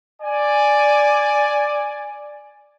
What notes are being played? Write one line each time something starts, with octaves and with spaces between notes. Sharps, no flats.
D5 G#5